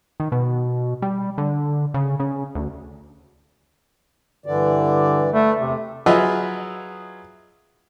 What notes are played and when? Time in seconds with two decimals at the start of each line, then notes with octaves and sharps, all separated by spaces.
0.20 D#3
0.32 B2
1.02 G3
1.38 D3
1.94 C#3
2.20 C#3
2.55 D2
4.46 G2 D3 E3 D5
5.32 A3 B4
5.60 E2 C3
6.06 F#3 F4 G#4 B4 D#5 E5